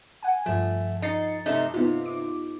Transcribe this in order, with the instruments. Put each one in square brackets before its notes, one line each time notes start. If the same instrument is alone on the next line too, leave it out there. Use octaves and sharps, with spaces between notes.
[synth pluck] F#5 G#5
[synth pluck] G2 F3 [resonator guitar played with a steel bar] A3
[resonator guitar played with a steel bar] D#4 [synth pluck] A6 C7 C#7
[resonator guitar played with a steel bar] C3 A3 D#4
[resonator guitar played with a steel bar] C3 [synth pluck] B3 D#4 F4
[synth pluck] D6